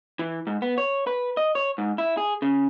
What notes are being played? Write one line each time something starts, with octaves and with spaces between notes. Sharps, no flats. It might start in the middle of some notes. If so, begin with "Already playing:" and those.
E3
G#2
B3
C#5
B4
D#5
C#5
G#2
E4
G#4
C#3